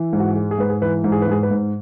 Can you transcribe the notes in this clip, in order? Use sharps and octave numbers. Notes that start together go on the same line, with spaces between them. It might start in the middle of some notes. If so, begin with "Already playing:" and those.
Already playing: E3
G#2
F#4
G#3
G#4
G#2 B4
G#4
E3 B4
G#2
G#4
B4
G#2 G#4
B4
G#2